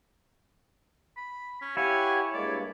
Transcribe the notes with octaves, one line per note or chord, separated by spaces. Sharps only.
B5
C#4
E4 G4 C#5 F5 F#5 G#5
G2 G#3 A#3 D5